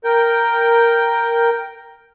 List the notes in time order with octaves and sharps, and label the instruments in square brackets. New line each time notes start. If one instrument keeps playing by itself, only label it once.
[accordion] A#4 G5